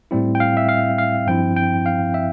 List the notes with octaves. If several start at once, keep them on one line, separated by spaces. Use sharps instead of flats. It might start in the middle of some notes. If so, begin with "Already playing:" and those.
A2 G3 C4 E4
G5
F5
E5
F5
F5
G2 F3 C4 E4 G5
G5
F5
E5